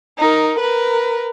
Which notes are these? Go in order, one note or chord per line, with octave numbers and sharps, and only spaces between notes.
D#4 A#4
A#4 B4